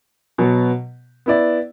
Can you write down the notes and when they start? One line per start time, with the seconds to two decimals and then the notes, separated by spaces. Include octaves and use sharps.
0.38 B2 F#3 B3
1.26 B3 E4 D5